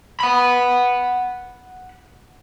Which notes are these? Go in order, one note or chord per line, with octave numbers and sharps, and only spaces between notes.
F#5 B5